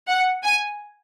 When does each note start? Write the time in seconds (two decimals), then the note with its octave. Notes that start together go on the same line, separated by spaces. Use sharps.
0.09 F#5
0.44 G#5